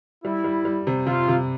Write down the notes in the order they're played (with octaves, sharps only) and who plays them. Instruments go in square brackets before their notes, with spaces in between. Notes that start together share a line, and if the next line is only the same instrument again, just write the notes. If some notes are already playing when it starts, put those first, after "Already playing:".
[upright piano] G3 [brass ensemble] E4
[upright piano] G3
G3
C3
[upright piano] C3 [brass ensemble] F4
[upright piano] C3